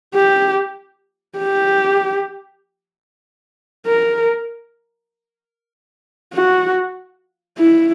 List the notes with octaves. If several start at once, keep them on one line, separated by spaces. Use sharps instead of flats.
G4
G4
A#4
F#4
E4